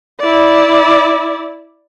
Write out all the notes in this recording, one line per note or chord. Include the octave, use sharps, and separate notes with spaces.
E4 D5